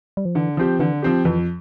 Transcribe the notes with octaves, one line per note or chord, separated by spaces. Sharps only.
G3
F3
D3 E3
F3 C4 G4
D3 E3
F3 C4 G4
F2 E3